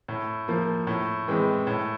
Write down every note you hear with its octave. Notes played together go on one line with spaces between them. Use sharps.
A2
F3 A#3
A2
E3 G#3 C4
A2